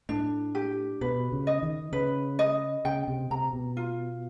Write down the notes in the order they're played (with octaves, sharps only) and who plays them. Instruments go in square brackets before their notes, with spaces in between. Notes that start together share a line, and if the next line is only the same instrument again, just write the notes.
[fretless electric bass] A2 [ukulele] D4
[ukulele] G4
[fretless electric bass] B2 [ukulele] B4
[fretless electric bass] C#3
[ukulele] D#5
[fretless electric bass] D#3
[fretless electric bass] C#3 [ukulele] B4
[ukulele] D#5
[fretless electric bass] C#3 [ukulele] G5
[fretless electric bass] C3
[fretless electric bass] C3 [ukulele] A#5
[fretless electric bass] B2
[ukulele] F4